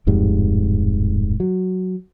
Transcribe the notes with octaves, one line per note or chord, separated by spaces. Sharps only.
D1 F2 G#2 G3
F#3